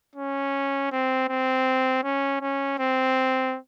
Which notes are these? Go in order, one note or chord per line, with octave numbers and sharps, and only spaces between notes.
C#4
C4
C4
C#4
C#4
C4